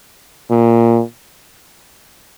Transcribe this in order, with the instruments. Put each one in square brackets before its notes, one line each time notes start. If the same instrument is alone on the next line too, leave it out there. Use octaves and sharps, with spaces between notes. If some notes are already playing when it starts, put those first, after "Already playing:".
[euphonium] A#2